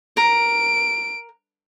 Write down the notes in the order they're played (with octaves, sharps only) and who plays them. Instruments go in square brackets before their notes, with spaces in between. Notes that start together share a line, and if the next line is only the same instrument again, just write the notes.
[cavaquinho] A#4 [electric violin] D7